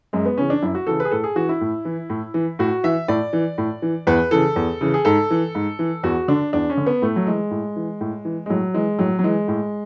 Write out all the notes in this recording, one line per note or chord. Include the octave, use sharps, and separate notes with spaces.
F#2 G#3
B3
C#3 E3 C#4
D4
F#2 E4
F#4
C#3 E3 A4
B4
G#4
A2 A4
G#4
E3 F#4
E4
A2
E3
A2
E3
A2 F#4
E3 E5
A2 D5
E3
A2
E3
E2 B4
C#3 E3 A4
E2
C#3 E3
G#4
G#2 A4
E3
G#2
E3
E2 F#4
D3 D4
E2 D4
C#4
D3
B3
A2 A3
F#3
E3 G#3
A2
E3
A2
E3
G#3
A2 F#3
E3 G#3
A2 F#3
F#3
E3 G#3
A2